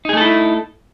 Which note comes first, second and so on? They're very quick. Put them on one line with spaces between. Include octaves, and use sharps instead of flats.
D#4 G#4 A3 A4 E4